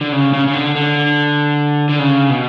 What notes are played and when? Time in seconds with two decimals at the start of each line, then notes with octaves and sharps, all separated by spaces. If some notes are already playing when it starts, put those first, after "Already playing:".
0.01 D3
0.13 C#3
0.33 C#3
0.48 C#3
0.53 D3
0.75 D3
1.89 D3
1.99 C#3
2.30 B2